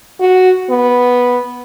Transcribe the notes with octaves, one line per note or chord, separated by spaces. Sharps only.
F#4
B3